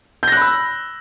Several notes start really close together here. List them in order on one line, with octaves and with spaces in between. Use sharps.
G6 A#6 F#6 B5 E6